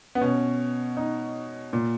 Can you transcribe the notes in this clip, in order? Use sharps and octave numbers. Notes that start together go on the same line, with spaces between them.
B3
B2 C#4
D#4
A#2